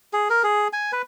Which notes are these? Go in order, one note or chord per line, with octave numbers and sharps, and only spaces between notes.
G#4
A#4
G#4
G#5
B4